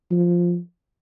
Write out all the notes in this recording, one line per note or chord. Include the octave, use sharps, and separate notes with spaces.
F3